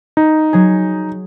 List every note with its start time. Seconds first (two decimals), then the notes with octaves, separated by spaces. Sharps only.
0.17 D#4
0.53 F#3 G#4